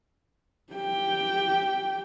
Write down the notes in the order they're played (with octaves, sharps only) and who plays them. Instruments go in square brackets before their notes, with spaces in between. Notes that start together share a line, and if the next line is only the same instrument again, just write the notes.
[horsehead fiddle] G4 G5